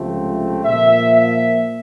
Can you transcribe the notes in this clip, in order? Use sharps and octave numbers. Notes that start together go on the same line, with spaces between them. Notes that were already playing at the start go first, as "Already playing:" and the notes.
Already playing: C#2 C3 F3 A3 C4
A#2 F3 A#3 E5
E5